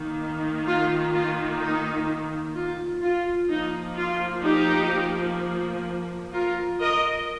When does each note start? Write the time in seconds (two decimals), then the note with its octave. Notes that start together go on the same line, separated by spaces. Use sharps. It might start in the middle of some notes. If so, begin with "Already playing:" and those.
Already playing: D#3 A#3
0.66 F4
1.14 F4
1.61 D#4
2.55 F4
3.02 F4
3.50 F3 A#3 D#4
3.97 F4
4.44 D#4 G4
6.33 F4 A#4
6.80 A#4 D#5